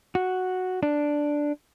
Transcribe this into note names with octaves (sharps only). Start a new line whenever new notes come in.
F#4
D4